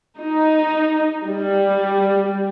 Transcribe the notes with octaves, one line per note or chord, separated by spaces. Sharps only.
D#4
G3